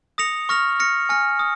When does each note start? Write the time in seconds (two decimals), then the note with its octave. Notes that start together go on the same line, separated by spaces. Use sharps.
0.18 D#6 A#6 C#7 F7
0.49 C#6 F6 A#6 F7
0.79 F6 A#6 C#7
1.09 G#5 F6 A#6 C#7
1.39 D#6